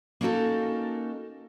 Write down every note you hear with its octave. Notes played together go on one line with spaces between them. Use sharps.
A#3 C#4 D#4 F#4 A4 A#4